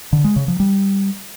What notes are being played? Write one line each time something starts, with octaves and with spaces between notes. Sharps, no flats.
D3
G#3
C#3
F3
G3